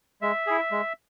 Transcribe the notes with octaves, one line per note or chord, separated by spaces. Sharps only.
G#3 E5
E4 G#4
G#3